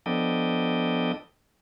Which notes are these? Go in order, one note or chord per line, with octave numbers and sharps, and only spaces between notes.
F3 B3 D4 A4 D#5 G5